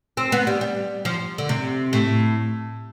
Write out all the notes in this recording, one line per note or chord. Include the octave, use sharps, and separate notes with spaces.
C4
B3
G3
G3
F3
D3
C3
A2